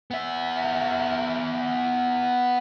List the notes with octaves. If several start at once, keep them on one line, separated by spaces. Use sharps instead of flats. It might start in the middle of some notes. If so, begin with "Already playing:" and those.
B3 E5